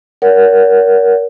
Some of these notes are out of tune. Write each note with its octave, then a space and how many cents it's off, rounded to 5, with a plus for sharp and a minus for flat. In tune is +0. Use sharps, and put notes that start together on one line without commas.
A#4 +20 C#5 +40 F#5 +5